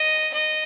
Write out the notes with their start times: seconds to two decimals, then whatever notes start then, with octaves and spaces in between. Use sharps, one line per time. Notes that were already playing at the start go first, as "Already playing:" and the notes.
Already playing: D#5
0.33 D#5